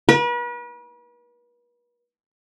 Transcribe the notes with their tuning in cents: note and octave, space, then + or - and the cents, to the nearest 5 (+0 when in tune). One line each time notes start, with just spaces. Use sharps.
B4 -40